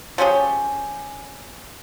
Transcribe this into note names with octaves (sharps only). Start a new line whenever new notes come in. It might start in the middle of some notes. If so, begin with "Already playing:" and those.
F3 C#4 G4 G#4